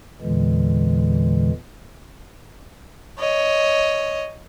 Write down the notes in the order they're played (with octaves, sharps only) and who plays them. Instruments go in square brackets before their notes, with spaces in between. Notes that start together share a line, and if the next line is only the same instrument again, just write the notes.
[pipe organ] E2 A#2 D3 E3 G#3
[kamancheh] C#5 D#5